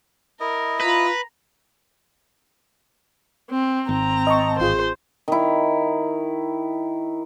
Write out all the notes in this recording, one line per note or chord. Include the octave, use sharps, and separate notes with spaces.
E4 A#4 D#5
F4 B4 A#5
C4
G#1 C4 A#5
D#5 A5 C#6
A1 F4 G#4 C5
D#3 E4